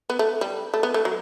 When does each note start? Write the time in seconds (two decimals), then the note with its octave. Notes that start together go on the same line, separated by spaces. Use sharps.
0.10 B3
0.19 A3
0.41 G3
0.74 A3
0.83 B3
0.94 A3
1.05 F#3